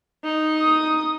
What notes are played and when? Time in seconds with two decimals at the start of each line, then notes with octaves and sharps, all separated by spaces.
0.24 D#4
0.59 D#6